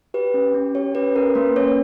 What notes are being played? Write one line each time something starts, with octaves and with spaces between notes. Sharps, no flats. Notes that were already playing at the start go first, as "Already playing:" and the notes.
G4 B4
C#4
C#4
G4 C#5
C#4 B4
C#4 A#4
A#3 B4
C#4 C#5